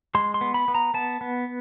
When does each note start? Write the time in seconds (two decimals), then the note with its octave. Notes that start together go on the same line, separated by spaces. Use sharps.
0.15 G#3 C6
0.34 C6
0.41 B3
0.54 B5
0.68 B3
0.75 A#5
0.94 B3 A5
1.21 B3